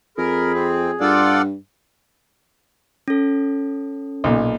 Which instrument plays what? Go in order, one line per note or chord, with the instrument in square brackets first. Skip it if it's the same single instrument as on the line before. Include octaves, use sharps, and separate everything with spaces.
[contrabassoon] F2 [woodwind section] G#4 [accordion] A#4 [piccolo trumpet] B5
[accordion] C4
[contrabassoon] G2 [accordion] F4 A4 D5 [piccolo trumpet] F#5
[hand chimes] C#4 A4
[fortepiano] B1 A#2